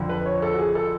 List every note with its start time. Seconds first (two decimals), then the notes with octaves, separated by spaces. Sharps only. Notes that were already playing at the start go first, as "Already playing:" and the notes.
Already playing: F2 D3 F3
0.09 B4
0.26 C#5
0.42 A4
0.53 F#4
0.58 G#4
0.75 A4